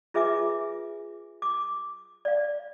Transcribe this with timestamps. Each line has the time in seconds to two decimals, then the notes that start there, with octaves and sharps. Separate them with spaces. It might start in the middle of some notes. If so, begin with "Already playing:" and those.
0.14 F4 G#4 B4 E5 G#5 D6
1.42 D6
2.25 D5 F5